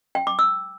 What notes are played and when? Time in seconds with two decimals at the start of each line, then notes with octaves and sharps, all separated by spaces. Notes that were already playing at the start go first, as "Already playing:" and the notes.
0.15 G5
0.27 D6
0.39 E6